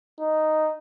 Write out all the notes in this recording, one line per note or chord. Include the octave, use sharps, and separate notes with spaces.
D#4